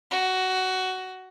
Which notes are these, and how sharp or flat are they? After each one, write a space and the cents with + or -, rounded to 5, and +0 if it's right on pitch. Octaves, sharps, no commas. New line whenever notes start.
F#4 +15